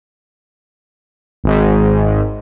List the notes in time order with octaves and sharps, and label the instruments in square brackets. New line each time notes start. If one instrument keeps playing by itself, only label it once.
[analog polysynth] G#1 G#2